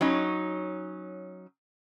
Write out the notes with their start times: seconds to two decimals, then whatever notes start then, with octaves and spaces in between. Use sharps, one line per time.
0.01 F#3 C#4 D#4